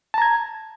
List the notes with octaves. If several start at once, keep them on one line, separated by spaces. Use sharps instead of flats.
A5 A#5 G#6